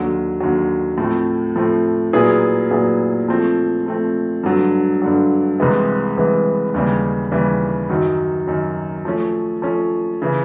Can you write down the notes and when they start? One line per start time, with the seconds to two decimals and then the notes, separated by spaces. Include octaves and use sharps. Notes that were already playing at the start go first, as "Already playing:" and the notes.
Already playing: D#2 D3 F#3
0.40 D#2 D3 F#3
0.98 A2 F3 A3 C4
1.56 A2 F3 A3 C4
2.13 A#2 F#3 B3 E4 G#4
2.71 A#2 F#3 B3 E4 G#4
3.28 F3 A3 C4
3.86 F3 A3 C4
4.43 G2 D3 F#3
5.02 G2 D3 F#3
5.60 C2 C3 E3 G#3 B3
6.17 C2 C3 E3 G#3 B3
6.74 D#2 C#3 E3 G3
7.32 D#2 C#3 E3 G3
7.90 F#2 D#3 F#3
8.47 F#2 D#3 F#3
9.05 F3 A3 C#4
9.62 F3 A3 C#4
10.22 C#3 E3